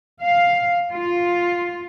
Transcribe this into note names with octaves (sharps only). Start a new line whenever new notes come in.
F5
F4